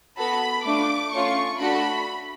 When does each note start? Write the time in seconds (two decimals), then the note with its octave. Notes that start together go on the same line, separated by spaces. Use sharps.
0.17 B3 F#4 A4 B5
0.65 A3 D4 F4 D6
1.12 A3 C#4 F4 C#6
1.60 A3 D4 F#4 A4 B5